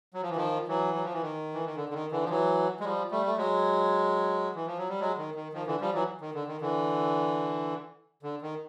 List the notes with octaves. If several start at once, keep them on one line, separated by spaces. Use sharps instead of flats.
F#3
F3
E3
D#3 F3
E3 F#3
F#3
F3
E3
D#3
E3
D#3
D3
D3
D#3
D3 E3
F3
E3 F#3
G#3
F3 G3
G3 A3
A3
F#3 G#3
E3
F3
F#3
G3
F#3 G#3
D#3
D#3
D#3 F3
D3 E3
F3 G3
E3 F#3
D#3
D3
D#3
D3 E3
D3
D#3